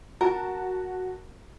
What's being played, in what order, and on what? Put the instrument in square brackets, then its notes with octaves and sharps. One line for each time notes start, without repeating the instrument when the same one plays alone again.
[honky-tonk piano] F#4 A5 [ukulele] A#4